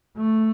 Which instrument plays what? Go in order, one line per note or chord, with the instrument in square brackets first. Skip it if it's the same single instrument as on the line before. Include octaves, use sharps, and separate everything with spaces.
[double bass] A3